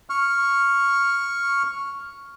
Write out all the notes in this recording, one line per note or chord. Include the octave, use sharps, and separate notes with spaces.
C#6 F6